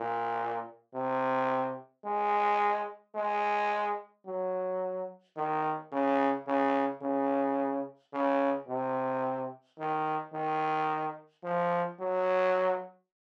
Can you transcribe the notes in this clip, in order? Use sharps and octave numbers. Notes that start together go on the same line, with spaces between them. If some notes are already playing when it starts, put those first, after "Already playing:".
Already playing: A#2
C3
G#3
G#3
F#3
D#3
C#3
C#3
C#3
C#3
C3
D#3
D#3
F3
F#3